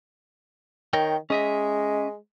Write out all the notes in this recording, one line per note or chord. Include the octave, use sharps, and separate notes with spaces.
D#3 A#4 C#5 G5
G#3 C#4 D#5 E5